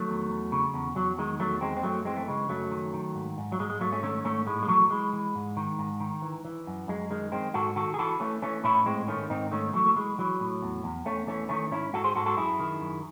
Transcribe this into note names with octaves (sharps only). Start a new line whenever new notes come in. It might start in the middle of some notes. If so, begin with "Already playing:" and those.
Already playing: D#3 F#3 A3
E2
E2
C#3
E2
E2 F#3
D#3 G#3
E2 F#3 A3
E2 G#3 C4
C4
F#2 F#3 A3
E3 G#3 C4
A3
C#3 G#3
F#2 F#3 A3
D#3
D#3
G#2
G#2
F#3
G#2 G#3
G#3
G#2 F#3 A3
A3 C#4
D#3 A3 C#4
G#2 A3 C#4
A2 G#3
G#3
E3 F#3 A3
E3 G#3
E3
G#2
D#3
G#2
D#3
E3
E3
F#2
F#2 G#3
D#3 G#3
D#3 G#3 C4
G#2 F#4 A4
D#3 F#4 A4
G#4
E3 F#4 A4
E3 A3 C#4
E3 A3 C#4
A2 C#4 E4
G#2 G#3 C4
D#3 A3 C#4
G#2 C4 D#4
D#3 A3 C#4
E3 F#3 A3
A3
E3 G#3
E3 F#3
A2
E2
E2
E2 A3 C#4
E3 A3 C#4
D#3 A3 C#4
G#2 C#4 E4
G#2 F#4 A4
G#4 C5
G#2 F#4 A4
F#4 A4
F#2 E4 G#4
D#3
F#2